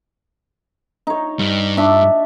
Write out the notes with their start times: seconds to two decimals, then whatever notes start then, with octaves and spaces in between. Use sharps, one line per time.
1.07 D#4 C#5
1.39 G2
1.77 D4 E5 C#6